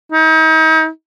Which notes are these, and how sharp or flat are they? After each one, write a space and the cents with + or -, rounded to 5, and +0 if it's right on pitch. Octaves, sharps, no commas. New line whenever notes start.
D#4 +40